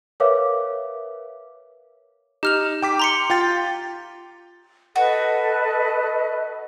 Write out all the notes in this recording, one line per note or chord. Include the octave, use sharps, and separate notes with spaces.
A#4 B4 C#5 E5 F5 D6
D#4 G4 F6 F7
G5 D6 B6
A#5 C6 C#7
F4 G5 A6
F#4 A4 B4 D#5